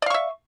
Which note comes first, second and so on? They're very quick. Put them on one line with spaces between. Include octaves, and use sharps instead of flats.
D5 F5 C#6 E5